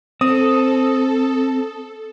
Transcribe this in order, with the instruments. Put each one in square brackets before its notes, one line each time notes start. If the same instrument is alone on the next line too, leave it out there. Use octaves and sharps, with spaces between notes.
[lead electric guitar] C4 [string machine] A4 [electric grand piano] D#6